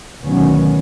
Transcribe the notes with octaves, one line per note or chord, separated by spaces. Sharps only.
D2 B2 D#3 F#3 B3 C#4